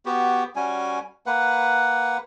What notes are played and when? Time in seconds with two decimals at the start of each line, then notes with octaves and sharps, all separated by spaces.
0.06 B3 F#4 G4
0.56 G3 C#4 F#4 G#5
1.26 A#3 B4 F#5